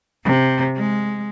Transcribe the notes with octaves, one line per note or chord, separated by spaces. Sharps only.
C3
G#3